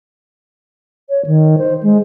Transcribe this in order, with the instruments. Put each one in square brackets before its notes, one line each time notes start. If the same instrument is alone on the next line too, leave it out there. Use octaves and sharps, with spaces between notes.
[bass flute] C#5
D#3
C5
G#3